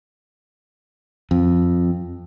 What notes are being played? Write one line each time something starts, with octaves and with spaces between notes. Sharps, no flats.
F2